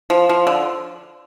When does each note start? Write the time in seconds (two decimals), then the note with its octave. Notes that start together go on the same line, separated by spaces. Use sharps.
0.10 F3
0.29 F3
0.47 D3